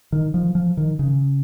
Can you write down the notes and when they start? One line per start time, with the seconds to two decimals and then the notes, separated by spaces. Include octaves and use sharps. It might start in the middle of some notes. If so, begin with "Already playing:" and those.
0.12 D#3
0.34 F3
0.55 F3
0.77 D#3
0.99 C#3